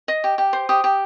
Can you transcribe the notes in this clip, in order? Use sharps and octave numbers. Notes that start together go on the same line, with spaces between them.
D#5
G4
G4
C5
G4 D#6
G4